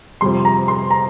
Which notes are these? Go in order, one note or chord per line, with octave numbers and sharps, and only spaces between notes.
F2 C3 G3 C6
A#5
C6
A#5